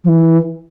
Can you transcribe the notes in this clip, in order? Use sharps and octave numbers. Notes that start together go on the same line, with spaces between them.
F3
E3